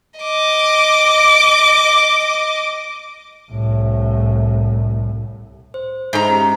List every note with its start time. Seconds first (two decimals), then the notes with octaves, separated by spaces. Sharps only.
0.20 D#5 D6
3.52 C2 A2
5.74 C5
6.13 G#2 C5 A#5
6.29 C#4 G4